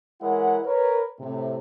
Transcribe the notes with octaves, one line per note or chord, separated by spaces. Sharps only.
E3 G#3 E4 A#4 C#5 F#5
A#4 B4 C#5
A2 C3